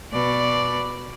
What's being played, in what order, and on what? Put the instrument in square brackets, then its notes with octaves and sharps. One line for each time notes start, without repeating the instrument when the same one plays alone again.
[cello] B2 D5